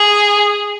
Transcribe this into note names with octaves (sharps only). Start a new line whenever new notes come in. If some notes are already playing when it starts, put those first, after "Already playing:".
Already playing: G#4